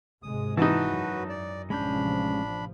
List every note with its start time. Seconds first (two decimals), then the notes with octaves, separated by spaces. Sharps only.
0.23 G#1 C3 G#3 D#6
0.57 E3 D#4 F#4 B4 A5
0.90 F#2
1.29 D5
1.70 A1 C3 F3 G#3 C#4 D4 B5 G6